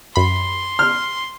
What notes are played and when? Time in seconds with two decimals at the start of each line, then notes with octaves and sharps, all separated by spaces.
0.16 F#2 B5 C6
0.79 F6